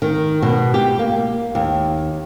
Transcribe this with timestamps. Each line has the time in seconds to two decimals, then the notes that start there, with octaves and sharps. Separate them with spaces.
0.02 D#3
0.42 B2
0.74 G4
0.99 A#3
1.55 D#2